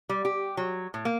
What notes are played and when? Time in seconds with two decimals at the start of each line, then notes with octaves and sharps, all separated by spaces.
0.09 G3
0.25 G4
0.57 F#3
0.94 A2
1.05 A#3